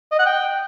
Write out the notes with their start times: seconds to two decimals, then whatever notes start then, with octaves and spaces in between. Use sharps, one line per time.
0.12 D#5
0.19 F#5
0.26 G5